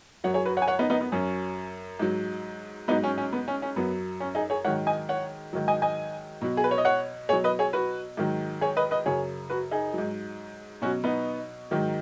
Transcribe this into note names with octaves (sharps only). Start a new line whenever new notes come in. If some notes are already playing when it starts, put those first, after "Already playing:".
F#2 F#3 C#5 F#5
G#4 C#5
F#4 B4
C#5 F#5
G#5
C#5 F#5
B3 D#4
B3 D#4
B3
F#2 F#3 C#4
G#2 F#3
G#2 F#3 B3 D#4
C#4
C#4
B3
C#4
C#4
F#2 F#3 B3
C#4
D#4 G#4
G#4 C#5
G#2 D#3 F#3 C#5 F#5
D#5 G#5
C#5 F#5
G#2 D#3 F#3
D#5 G#5
D#5 G#5
B2 F#3
G#4
B4
C#5
D#5
C#5 F#5
B2 F#3 G#4 C#5
B4 D#5
G#4 C#5
F#4 B4
G#2 D#3 F#3
G#4 C#5
B4 D#5
B4 D#5
F#2 C#3 F#3 G#4 C#5
F#4 B4
D#4 G#4
G#2 F#3
B2 F#3 C#4 F#4
B3 D#4
G#2 D#3 F#3